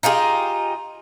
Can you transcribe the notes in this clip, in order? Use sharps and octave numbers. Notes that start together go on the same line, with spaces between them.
D#4 F4 G4 G#4